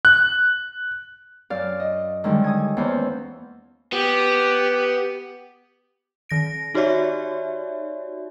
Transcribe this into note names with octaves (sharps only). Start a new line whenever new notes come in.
F#6
F#2 D5 F5
D#5
D3 D#3 G3 G#3
G#5 D#6
E2 A#3 C#4 C5
B3 G4
D#3 A#6 D7
D#4 F#4 G4 C#5 D5 E5